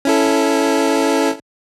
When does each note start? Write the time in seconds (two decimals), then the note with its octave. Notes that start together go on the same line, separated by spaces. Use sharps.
0.05 C#4 E4 A4